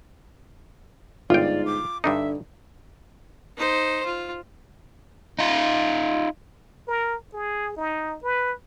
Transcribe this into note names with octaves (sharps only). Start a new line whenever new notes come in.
G1 G#2 F4 D5 G5
D6
G2 D3 D4 D#4 E5
D#4 C5
F4
D#4 F4
A#4
G#4
D#4
B4